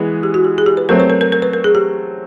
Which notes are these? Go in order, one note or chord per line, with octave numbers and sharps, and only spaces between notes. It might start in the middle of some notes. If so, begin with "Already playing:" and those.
Already playing: E3 G#3 B3
G4
F#4
G4
G#4
G4
B4
F#3 A3 C4 A#4
B4
A#4
A#4
A#4
B4
A#4
G#4
G4